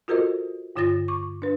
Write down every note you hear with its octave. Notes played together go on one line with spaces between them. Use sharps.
F4 F#4 A4 A#4 C5 D#5
G2 D3 F4 C#5 A6 A#6
C#6 D6
D4 B4